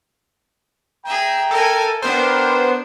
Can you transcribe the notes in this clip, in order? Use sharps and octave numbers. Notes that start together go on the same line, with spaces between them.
G#4 E5 G5 A#5
A4 A#4 G#5
B3 D4 G4 A#4 C5